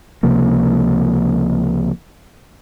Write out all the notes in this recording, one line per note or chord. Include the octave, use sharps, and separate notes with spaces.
C#2 C3 F3 A#3